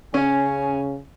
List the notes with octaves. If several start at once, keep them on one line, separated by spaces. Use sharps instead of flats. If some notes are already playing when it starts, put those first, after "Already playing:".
C#3 C#4 G#5